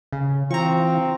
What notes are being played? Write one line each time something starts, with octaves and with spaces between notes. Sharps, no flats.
C#3
E3 C4 F4 A#5 C#6